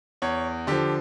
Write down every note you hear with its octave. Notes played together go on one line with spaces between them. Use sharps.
E2 C#5
D3 F3 G4